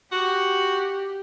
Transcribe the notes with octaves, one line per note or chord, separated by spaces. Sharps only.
F#4 G4